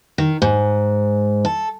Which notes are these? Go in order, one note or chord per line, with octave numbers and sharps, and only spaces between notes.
D#3
G#2
A4